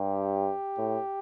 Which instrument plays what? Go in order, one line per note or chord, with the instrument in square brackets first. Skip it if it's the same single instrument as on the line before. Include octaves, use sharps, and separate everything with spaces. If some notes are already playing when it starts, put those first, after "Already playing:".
Already playing: [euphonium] G2 [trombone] G4
[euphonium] A2